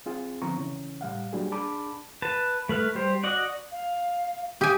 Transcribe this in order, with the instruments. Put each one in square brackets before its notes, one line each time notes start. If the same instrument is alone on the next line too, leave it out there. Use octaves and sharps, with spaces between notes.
[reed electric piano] C4 F4 G#4
D3 F3 B3 C4 A#5 C#6
C#3 E3 C#4
A2 G3 F5 F#5
F#3 G3 A#3 D4 F#4 G#4
D4 G#4 A5 B5 D6
[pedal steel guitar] B4 A5
A3 B4 F6
G3 G4 C5
F#4 D5 D#5 F#5
[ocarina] F5
[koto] G4 G#5 [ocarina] D#6